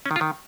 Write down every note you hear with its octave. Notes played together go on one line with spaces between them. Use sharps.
C#4
D#3
F4
D#3